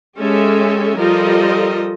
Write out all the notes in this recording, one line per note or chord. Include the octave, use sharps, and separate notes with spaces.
G#3 C#4 G4 A4 E5
F3 G3 F4 A4 A#4 D#5